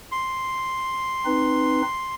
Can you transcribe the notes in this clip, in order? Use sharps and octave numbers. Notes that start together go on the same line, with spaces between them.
C6
C4 D#4 B4